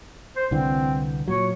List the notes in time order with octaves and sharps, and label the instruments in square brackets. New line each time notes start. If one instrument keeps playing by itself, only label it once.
[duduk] C5
[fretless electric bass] C2 D3 E3 [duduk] C4
[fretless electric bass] A#2 F#3 [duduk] C#5